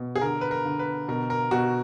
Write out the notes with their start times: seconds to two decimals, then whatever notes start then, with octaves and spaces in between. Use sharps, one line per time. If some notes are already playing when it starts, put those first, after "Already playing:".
Already playing: B2
0.16 G#4
0.21 D3 A#4
0.41 B4
0.51 A#4
0.65 D3
0.79 B4
1.08 B2 A#4
1.30 A#4
1.51 B2 F#4